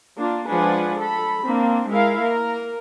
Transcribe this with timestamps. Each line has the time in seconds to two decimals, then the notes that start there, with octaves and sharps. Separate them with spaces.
0.17 A#3 D4 F4
0.48 F3 G#3 D4 B4 F#5 G#5
0.98 A4 B5
1.45 A#3 C4 D4
1.89 G#3 E4 A#4 F5
2.20 A#3 A#4